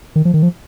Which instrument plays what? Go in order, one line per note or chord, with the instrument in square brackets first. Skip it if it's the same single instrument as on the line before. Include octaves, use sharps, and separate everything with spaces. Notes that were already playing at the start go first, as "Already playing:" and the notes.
[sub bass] D#3
F3
D#3
F3